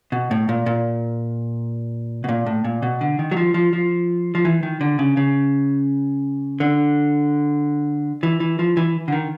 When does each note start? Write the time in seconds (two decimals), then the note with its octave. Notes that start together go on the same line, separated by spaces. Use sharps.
0.12 B2
0.31 A2
0.49 A#2
0.66 A#2
2.24 B2
2.29 A#2
2.46 A2
2.64 A#2
2.82 B2
3.01 D3
3.19 D#3
3.31 F#3
3.37 F3
3.54 F3
3.73 F3
4.35 F3
4.45 E3
4.63 D#3
4.81 D3
4.99 C#3
5.17 C#3
6.60 D3
8.23 E3
8.40 E3
8.59 F3
8.77 E3
9.08 D3
9.12 D#3